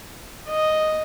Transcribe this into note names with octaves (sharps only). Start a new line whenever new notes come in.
D#5